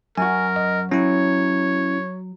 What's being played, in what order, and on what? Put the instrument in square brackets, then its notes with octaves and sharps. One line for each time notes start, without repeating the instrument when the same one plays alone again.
[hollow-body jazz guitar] F#2 F#4 [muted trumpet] A#4 [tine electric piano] G#5
[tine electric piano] D#5
[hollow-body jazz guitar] F#3 [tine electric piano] C#4 E4 [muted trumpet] C#5